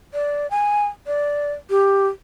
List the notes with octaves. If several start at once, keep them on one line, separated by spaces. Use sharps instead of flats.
D5
G#5
D5
G4